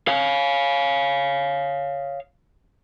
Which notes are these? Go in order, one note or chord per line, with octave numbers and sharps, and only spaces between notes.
C#5 F5